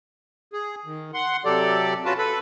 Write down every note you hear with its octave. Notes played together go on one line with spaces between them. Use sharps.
G#4
D#3
F#5 C6
C3 F#3 G4 A4 D5
C#4 F4 F#4 B4 A5
A4 B4 B5